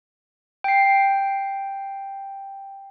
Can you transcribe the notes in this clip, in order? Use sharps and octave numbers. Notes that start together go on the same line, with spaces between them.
G5 C7